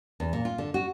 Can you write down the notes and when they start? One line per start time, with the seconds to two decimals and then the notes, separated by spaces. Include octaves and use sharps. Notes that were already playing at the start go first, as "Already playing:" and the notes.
0.20 E2
0.33 A#2
0.45 F4
0.58 D3
0.74 F#4